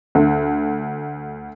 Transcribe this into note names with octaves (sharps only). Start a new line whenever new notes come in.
D2